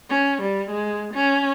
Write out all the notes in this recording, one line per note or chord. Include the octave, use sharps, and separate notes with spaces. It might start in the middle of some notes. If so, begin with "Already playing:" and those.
C#4
G3
G#3
C#4